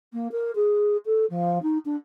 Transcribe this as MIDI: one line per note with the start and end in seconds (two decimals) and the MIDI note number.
0.13 0.28 58
0.32 0.51 70
0.55 0.97 68
1.05 1.25 69
1.30 1.61 53
1.62 1.78 63
1.85 1.96 62